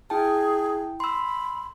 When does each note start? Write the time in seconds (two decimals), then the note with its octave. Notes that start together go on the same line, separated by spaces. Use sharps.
0.10 E4 G#4 G5 A5
1.00 B5 C6 E6